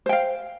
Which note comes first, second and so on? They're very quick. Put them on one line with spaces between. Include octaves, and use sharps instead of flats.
C5 G5 F5